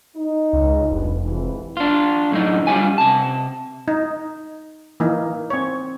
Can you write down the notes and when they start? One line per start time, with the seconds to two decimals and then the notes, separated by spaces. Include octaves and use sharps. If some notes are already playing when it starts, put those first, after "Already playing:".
0.16 D#4
0.53 C#2
0.91 F1 G2 B4
1.23 F2 G#2 E3
1.77 D4 F4
2.31 F#2 A2 D3 D4 D#4
2.67 G2 G3 C#4 F4 G#5
2.98 C3 A5
3.88 D#4
5.00 E3 A#3 D#4
5.50 C4 C#5